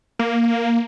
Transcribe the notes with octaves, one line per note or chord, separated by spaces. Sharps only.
A#3